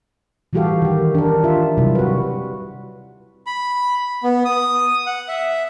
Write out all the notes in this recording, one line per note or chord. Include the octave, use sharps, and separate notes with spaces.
E3 G3 F#4 G4 A4 F5
D#3 G4
D4 A#4
F4 E5
C3 F#3 G3 E4
F#4 B4
B5
B3
D#6
F#5
E5